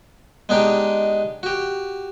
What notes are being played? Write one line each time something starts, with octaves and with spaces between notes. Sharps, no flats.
G#3 B3 D4 D#4 G4
F#4 G4